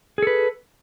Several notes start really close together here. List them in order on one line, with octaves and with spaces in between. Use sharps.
G#4 A4 B4